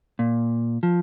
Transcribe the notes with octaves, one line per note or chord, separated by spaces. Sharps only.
A#2
F3